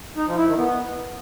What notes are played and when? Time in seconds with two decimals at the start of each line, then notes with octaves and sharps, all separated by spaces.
0.17 D#4
0.27 F3
0.37 E4
0.47 D#3
0.57 B3